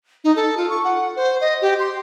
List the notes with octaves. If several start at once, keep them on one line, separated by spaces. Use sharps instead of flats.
D#4
A4
F4
C#6
F#5
C5
D#5
G4
C6